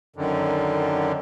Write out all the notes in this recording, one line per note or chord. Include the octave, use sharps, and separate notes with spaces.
F#2 D3 D#3